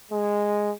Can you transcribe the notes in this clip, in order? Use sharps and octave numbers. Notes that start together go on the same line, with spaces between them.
G#3